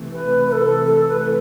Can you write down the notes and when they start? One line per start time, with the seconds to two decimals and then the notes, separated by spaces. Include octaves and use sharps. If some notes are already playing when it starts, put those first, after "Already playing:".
Already playing: C3 E3 A3
0.11 B4
0.48 B4
0.52 A4
0.84 A4
1.08 B4